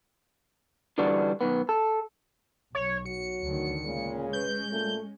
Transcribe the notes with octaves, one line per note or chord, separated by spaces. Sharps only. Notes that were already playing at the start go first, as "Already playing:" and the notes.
D3 E3 G3 D4 F#4
B1 G2 D#3 B3
A4
B1 C#5
F#3 F#4 C#7
D2 D3 D#3
A#2 C#3 G#3 C#4
B4 G6
A#2 A3